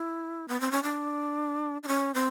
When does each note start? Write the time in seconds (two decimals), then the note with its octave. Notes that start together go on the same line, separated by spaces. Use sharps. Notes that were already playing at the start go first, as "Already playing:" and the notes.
Already playing: E4
0.48 B3
0.60 C4
0.71 C#4
0.83 D4
1.83 D4
1.88 C#4
2.14 C4